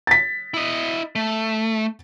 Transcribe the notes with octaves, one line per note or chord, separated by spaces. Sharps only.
A6 B6
E4 D#5
A3